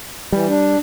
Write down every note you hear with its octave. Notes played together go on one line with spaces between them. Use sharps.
E3 G3
D4